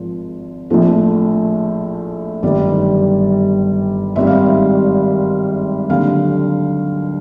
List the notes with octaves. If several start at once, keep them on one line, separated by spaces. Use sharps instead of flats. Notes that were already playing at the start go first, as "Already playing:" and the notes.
Already playing: G#1 F3
A#1 A2 F3 A3
G1 F#2 D#3 G3 D5
G#1 G#2 D#3 G3 E5
F5
E5
D#2 D3 F#3 F5